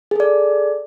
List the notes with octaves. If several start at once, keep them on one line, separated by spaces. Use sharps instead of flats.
G#4 A4 D5